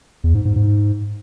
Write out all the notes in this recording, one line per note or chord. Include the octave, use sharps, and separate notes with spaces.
E2
G#2
G#2
G#2